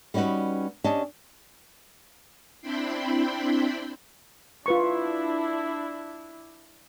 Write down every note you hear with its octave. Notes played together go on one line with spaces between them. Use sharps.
G3 C#4 D#4 F#4 B4
C#4 D4 G4 D#5 A5
C4 D4 E4 G5 B5 C6
D4 E4 F4 B4 C#6